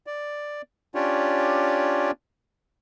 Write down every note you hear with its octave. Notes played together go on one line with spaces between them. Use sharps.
D5
C#4 D4 F4 G4 C#5 D5